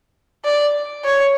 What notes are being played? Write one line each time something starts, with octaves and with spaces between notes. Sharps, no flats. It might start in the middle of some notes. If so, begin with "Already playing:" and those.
D5
C#5